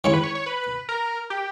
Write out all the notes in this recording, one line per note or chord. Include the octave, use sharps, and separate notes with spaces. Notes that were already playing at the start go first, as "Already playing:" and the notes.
D#3 G#3 C#4 E4 C#5
B4
C#5
C#5
B4
A#4
G4